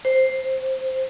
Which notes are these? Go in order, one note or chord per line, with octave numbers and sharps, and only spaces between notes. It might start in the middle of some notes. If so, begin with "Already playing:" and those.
C5